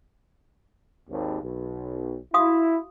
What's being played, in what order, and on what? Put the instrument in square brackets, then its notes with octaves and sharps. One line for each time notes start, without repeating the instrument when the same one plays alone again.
[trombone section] G#1 D#2
B1
[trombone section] E4 [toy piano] F#4 F5 D#6